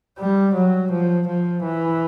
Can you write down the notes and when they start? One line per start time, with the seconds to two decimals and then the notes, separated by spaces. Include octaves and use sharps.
0.19 G3
0.54 F#3
0.92 F3
1.27 F3
1.64 E3